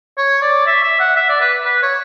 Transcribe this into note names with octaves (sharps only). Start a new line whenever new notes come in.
C#5
D5
E5
E5
F#5
E5
D5
B4
B4
C#5